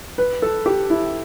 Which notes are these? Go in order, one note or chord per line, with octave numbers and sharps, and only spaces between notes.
B4
A4
G4
E4